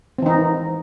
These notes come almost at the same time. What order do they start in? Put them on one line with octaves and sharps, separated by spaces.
C4 E3 D#4